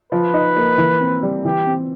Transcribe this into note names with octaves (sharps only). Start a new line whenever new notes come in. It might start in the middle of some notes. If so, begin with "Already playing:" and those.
F3 B4
D#4
A#3
E3
C4
G3
E3 G4
C4